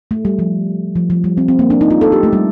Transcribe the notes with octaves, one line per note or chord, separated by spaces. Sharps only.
A3
G3
F3
F3
F3
G3
C4
C4
A#3
D4
D#4
F4
A4
G4
A3
G3